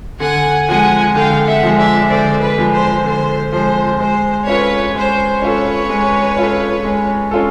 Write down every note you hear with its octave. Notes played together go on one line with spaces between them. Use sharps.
D3 F#5 G#5
F3 G#3 F#5 G#5
D3 F5 G5
E5 F#5
F3 G#3
D5 E5
D3 C5 D5
B4
F3 G#3
C5
D3 C5
F3 G#3 C5
G#3 C5
C#4 F4 A4 B4 C#5
G#3 C5
C#4 F4 A4 B4 C#5
G#3
C#4 F4 A4
G#3
C#4 F4 A4